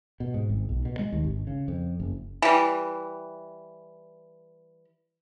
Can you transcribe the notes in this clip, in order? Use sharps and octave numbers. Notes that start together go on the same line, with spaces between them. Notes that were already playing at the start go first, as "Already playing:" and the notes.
B2
G#2
G#1
B1
B2
G#3
D#2
G#1
C#3
F2
F#1
E3 G3